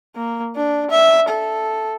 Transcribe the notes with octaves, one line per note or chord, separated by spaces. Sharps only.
A#3
D4
E5
A4